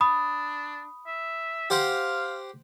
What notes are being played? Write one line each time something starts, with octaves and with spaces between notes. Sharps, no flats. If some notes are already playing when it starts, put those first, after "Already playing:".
D4 B5 D#6
E5
G4 C5 F5 F#5